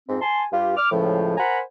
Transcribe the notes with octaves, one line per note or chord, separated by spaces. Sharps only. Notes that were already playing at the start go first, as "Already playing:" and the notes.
F2 G#2 C4
G#5 A5 C6
G2 F4 G4
D6 F6
C#2 A2 F3
A#4 C5 F#5 G#5 A#5 B5